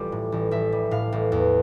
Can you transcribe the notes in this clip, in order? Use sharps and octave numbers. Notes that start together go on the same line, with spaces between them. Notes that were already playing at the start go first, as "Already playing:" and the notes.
Already playing: A1 G3 F4 G4
A2
A1
A1 E5
G3
A2 F5
A1
E2